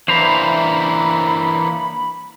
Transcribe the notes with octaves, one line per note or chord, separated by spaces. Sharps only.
E3 A#3 D4 E4 C5 A#5 B5